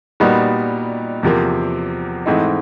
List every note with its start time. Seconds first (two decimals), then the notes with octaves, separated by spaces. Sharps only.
0.20 A#2 G3 B3 D#4 F#4
1.23 E2 C3 F3 A#3
2.26 G#2 E3 A3 C4 D#4